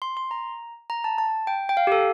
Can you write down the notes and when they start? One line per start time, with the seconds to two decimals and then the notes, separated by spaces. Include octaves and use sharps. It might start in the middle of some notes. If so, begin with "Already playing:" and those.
0.02 C6
0.17 C6
0.31 A#5
0.90 A#5
1.04 A5
1.18 A5
1.47 G5
1.69 G5
1.77 F5
1.87 G4
1.92 A4